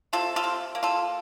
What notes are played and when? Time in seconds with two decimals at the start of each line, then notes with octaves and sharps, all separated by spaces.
0.13 C3 F4 A4
0.36 F4 A4
0.44 C3
0.75 A#3
0.83 F4 A4